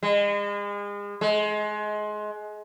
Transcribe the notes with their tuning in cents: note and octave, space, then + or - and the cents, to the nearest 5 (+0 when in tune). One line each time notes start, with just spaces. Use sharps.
G#3 -35
G#3 +25